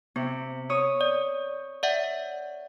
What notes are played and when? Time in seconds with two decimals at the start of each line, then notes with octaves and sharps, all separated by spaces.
0.16 C3 B3
0.69 C#5 D#6
1.01 D5
1.83 D5 E5 F#5